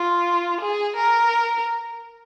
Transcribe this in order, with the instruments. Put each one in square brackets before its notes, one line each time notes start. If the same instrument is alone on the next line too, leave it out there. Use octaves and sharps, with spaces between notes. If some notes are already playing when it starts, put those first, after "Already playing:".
Already playing: [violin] F4
G#4
A#4